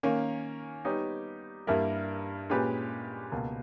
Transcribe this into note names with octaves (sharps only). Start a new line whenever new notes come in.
D#3 A#3 C#4
G3 B3 D#4 G4 C#5
G2 G3 A#3 E4 A#4
A#2 G#3 C#4 G4 B4
C#2 B2 A#3